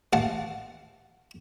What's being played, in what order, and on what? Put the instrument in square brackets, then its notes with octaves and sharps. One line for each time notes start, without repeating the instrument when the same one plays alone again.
[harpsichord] A1 F5 F#5 A5